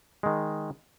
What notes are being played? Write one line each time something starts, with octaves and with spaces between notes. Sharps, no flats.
D#3 G#3